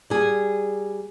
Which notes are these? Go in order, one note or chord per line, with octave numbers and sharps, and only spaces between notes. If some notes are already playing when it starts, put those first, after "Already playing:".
G3 G#4